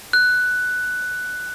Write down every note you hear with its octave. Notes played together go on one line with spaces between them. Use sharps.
F#6